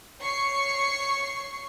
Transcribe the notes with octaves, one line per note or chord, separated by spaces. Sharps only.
C#5 C#6 C7 C#7